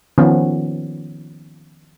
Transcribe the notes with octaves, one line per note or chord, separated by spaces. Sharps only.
D#3 F3 B3 C#4